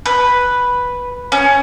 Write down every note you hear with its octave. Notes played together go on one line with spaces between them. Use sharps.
B4
C#4